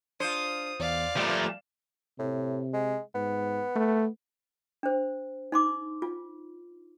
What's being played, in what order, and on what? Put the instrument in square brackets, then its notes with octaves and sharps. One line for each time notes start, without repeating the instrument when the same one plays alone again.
[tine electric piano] D4 [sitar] F4 C5 [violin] D#6
[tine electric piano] E2 [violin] D5 F5
[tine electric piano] F3 F4 B4 [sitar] G3 A#3 [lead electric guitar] A3 G4
[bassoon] A2 [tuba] C3
[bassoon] G#3
[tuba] G#2 [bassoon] B3
[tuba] A3
[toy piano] D4 C5
D#4 C6 D6
F4